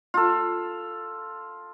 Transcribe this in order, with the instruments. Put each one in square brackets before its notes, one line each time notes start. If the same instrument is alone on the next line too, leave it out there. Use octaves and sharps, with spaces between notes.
[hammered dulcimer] F4 A4